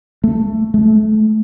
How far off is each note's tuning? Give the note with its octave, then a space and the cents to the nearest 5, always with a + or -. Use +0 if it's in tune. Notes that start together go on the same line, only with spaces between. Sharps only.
A3 +10
A3 -25